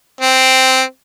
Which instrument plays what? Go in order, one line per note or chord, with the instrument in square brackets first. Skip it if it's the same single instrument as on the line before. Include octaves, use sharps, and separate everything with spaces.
[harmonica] C4